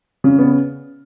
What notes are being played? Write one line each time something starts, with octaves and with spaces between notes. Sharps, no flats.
C#3
B3